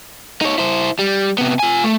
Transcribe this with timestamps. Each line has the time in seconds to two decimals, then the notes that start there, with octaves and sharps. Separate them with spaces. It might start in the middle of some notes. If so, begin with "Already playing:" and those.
0.41 D#4 C#5
0.58 E4 C5
0.99 G3
1.38 C3 B3
1.59 F4 G#5
1.84 A3